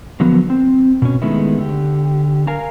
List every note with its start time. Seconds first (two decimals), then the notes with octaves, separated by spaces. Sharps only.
0.20 D3 F3 F#3 A#3 B3
0.50 C4
1.02 B2 C#4
1.22 D#3 G#3 A3 B3 E4
1.58 D3 G4
2.47 A#4 F5 G#5 A#5